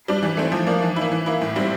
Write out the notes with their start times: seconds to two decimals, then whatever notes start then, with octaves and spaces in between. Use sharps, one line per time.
0.08 G3 D4
0.22 E3
0.37 A3 C4
0.52 F3
0.67 A#3 D4
0.82 E3
0.96 A#3 E4
1.11 E3
1.26 A#3 E4
1.42 A2
1.56 G3 C4 E4